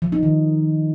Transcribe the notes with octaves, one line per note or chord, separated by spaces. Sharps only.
F3
D#4
D#3